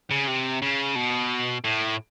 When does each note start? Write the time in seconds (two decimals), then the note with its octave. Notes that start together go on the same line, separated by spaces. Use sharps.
0.11 C#3
0.27 C3
0.62 C#3
0.95 B2
1.64 A2